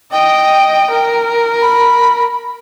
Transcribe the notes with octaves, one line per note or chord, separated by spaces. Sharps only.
D#5 G5
A#4
B5